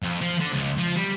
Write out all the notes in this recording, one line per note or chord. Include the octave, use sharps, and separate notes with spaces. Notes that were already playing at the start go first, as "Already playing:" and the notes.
F2
F3
D3
C#2
F3
G3